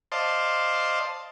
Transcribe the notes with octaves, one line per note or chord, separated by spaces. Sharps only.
C5 D5 D#5 F5 A5 C6